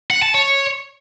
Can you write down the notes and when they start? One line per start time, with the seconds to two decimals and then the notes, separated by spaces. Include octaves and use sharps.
0.11 F#5
0.22 A5
0.34 C#5